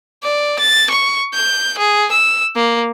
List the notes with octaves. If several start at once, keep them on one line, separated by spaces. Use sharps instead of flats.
D5
A6
C#6
G6
G#4
E6
A#3